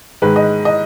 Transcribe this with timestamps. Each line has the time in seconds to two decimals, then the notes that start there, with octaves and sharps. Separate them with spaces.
0.22 G#2 D#3 G#3 B4
0.36 D#5
0.65 D#5